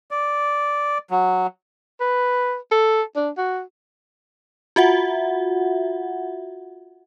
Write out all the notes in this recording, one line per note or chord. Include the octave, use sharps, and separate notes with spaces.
D5
F#3
B4
A4
D4
F#4
F4 F#4 E5 F#5